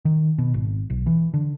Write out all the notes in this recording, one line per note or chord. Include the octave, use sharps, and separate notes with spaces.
D#3
B2
G#1
B1
E3
D3